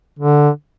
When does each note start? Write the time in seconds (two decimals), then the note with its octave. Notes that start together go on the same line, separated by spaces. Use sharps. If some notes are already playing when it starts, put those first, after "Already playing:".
0.19 D3